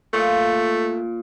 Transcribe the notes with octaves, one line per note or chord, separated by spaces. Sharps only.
A#2 A3